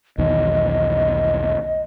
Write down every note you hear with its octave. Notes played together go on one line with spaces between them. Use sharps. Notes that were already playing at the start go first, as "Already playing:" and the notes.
B1 E2 D#3 D#5